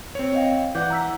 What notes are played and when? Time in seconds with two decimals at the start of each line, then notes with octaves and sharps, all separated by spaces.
0.15 C4 C#5
0.34 D#5 F5 G5
0.75 E3 D5 F#5 D6 G6
0.90 A#5 E6 B6